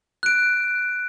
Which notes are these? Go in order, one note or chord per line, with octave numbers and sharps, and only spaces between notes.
F#6 D7